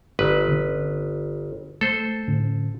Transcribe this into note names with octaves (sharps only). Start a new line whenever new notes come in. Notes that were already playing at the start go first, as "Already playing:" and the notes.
G1 B4
D3 C#4
A3 A4 C5
A2 D3 C#4